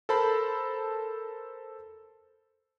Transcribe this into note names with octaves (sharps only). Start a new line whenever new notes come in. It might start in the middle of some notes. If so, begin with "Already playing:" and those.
A4 A#4 C5 A5 B5